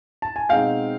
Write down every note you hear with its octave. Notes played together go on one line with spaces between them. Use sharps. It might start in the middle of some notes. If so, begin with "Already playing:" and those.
A5
G#5
B2 G#3 C4 D#4 F5 G5